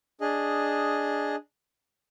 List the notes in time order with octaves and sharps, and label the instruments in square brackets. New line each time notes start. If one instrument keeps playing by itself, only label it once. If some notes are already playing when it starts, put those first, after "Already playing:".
[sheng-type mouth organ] D4 G#4 D#5